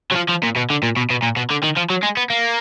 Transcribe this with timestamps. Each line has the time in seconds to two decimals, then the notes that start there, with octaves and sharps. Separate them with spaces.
0.12 F#3
0.16 F3
0.29 F3
0.43 A#2
0.56 B2
0.70 D3
0.83 A#2
0.97 B2
1.10 B2
1.23 A#2
1.37 B2
1.50 D3
1.63 D#3
1.77 F3
1.90 F#3
2.03 G#3
2.17 B3
2.30 A#3